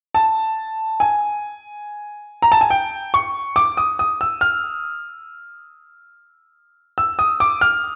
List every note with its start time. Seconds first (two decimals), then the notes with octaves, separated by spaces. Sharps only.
0.15 A5
1.00 G#5
2.42 A#5
2.52 A5
2.61 G#5
2.70 G5
3.14 C#6
3.56 D6
3.77 D#6
3.99 D#6
4.21 E6
4.41 F6
6.98 E6
7.19 D#6
7.40 D6
7.61 F6